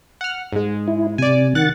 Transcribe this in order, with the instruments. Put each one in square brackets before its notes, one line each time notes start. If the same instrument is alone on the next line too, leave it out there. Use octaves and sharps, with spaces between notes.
[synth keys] F#5 F6
G#2 G#3
[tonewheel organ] E4
[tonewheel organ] C3 [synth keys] D5 G#5
[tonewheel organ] D#3 F#5 A6 [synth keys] F#6